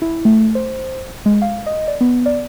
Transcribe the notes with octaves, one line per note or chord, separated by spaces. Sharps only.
E4
A3
C5
G#3
F5
D#5
D5
B3
D5